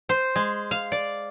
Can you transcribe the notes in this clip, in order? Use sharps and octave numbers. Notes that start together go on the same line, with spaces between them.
C5
G#3
F5
D5